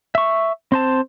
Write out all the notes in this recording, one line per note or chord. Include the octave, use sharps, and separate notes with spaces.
E5 C#6
C4 C5 A5